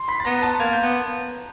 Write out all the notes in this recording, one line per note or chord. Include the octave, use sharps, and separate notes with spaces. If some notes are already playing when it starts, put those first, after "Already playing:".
Already playing: C6 C7
B5 B6
A6
B3 A#5 A#6
A5 A6
A#3 G#6
G6
B3